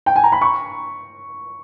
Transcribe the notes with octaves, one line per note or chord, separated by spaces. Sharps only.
G5
G#5
A#5
B5
C#6